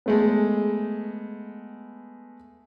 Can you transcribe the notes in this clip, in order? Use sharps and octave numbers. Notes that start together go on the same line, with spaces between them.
G#3 A3 B3